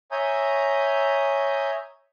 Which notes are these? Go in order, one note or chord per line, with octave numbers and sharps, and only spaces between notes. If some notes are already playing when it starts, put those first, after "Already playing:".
C#5 E5 G#5 A#5 D#6 G6